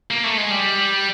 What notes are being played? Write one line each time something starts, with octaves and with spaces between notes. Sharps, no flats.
A#3
A3
G#3
G3